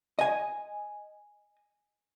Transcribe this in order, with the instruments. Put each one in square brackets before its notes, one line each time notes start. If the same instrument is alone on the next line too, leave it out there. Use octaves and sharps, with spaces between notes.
[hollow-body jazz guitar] D#5 G#5